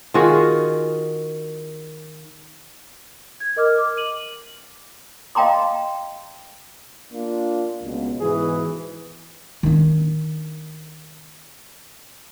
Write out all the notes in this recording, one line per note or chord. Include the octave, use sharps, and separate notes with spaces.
D#3 F4 F#4 G#4
G#6
A#4 D#5 D6 F6
D6
D#7 F#7
D#5 F5 G5 A#5 C6 D6
A#3 D4 F4
C#2 B2
G#2 B2 E3 G#4
D#3 D4